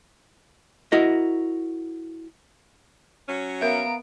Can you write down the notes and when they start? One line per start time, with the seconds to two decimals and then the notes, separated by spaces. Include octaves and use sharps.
0.92 E4 F#4 A#4 D#5
3.28 F#3 C#4
3.61 B3 A#4 E5 F5 A#5 D7